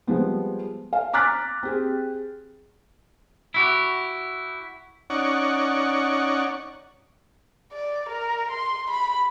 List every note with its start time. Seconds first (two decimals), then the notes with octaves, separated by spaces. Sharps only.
0.07 F3 G3 G#3 B3
0.93 F5
1.13 A#5 D6 F6 F#6 A6 B6
1.63 C4 G4 G#4
3.54 E4 F#4 G4
5.10 C#4 D#4 D5 F#5 C#6
7.73 D5
8.09 A#4
8.51 C6
8.90 B5